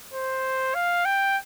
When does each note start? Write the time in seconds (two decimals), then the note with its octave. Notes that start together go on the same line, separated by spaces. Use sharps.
0.13 C5
0.75 F5
1.05 G5